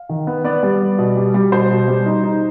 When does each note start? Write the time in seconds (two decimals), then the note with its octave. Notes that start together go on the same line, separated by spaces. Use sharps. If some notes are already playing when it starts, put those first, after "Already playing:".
Already playing: F5
0.09 D#3
0.27 B3
0.44 B3 D5
0.63 G3
0.81 B3
0.99 B2
1.17 G3
1.34 G3
1.52 B2 C5
1.71 B2
1.88 G3
2.06 D#4
2.24 D#4